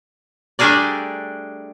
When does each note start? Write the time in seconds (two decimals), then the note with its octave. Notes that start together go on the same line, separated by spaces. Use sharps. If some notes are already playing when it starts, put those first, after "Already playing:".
0.59 G3 A3 D4 G#4 A#4 D5